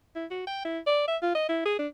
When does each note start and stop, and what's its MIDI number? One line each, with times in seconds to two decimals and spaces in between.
0.15 0.25 64
0.31 0.42 66
0.47 0.62 79
0.65 0.79 64
0.87 1.05 74
1.08 1.17 76
1.22 1.31 65
1.35 1.47 75
1.49 1.62 64
1.65 1.77 68
1.79 1.87 62